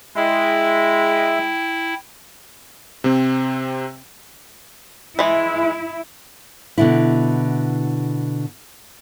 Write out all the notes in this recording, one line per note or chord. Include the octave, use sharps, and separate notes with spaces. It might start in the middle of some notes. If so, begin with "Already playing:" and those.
G#3 E4 E5 G5
C3 C4
E3 G#3 E4
B2 D3 E4